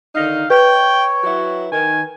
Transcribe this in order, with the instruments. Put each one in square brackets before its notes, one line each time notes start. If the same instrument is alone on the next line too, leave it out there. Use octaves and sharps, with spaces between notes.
[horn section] D3 D#3 D#4 [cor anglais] F5
[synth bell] B4 [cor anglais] C#5 [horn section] G5
[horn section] F#3 E4 F#4
[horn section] D#3 [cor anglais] G#5